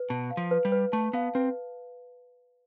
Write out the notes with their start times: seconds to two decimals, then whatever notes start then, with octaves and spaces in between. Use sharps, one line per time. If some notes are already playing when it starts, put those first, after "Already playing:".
Already playing: B4
0.09 B2 A5
0.31 F5
0.37 F3
0.51 B4
0.65 G3
0.72 B4
0.92 A3 A5
1.13 B3 F5
1.35 C4 B4